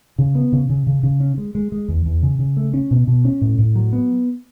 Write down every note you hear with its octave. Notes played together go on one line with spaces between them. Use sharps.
C#3
B3
C#3
C#3
C#3
C#3
C#4
G#3
G#3
G#3
E2
E2
C#3
C#3
A3
C#4
B2
B2
C#4
A2
A2
F#3
B3